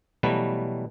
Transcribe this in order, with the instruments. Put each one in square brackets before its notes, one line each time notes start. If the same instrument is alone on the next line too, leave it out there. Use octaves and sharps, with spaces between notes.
[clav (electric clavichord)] B2 E3 F#3 G3 A3 B4